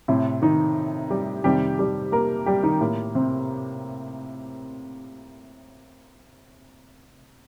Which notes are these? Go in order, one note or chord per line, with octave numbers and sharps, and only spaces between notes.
A2 C3 C4
D#3 D#4
G3 G4
F2 C3 D#3 G3 G4
G3 G4
A#3 A#4
G3 G4
D#3 D#4
A2 A#3
C3 C4